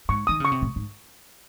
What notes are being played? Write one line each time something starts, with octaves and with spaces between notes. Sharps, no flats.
G#2 C#6
D#3 D#6
C#3 C#6
C3
A2
G#2